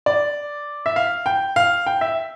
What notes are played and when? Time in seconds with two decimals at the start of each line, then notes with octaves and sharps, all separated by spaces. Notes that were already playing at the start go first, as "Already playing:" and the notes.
0.06 D5
0.86 E5
0.96 F5
1.26 G5
1.56 F5
1.87 G5
2.01 E5